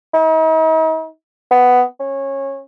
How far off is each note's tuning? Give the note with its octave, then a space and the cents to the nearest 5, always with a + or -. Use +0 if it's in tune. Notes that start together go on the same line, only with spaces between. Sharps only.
D#4 +45
B3 +10
C#4 -20